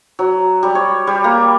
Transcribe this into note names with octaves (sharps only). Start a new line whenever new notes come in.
F#3
G3
C#5
G3
A#3